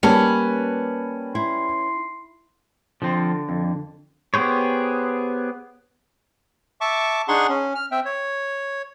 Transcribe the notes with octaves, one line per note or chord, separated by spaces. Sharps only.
G3 A#3 C#4 B4 A5
E4 C6
D3 F3 C4
F2
B3 G4 G#4 C5 C#5
E5 A5 C#6 D6
D4 D#4 G#4 F#5 C6 C#6
C#4
F6
C4 E5 G5
C#5